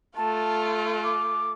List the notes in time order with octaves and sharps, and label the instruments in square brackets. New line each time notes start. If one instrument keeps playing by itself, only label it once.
[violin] A3 F4 [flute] A5
[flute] D6